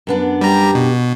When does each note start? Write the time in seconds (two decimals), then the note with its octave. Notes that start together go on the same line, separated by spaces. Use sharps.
0.07 F#2 B3 D4
0.41 G3 G4 A#5
0.75 B2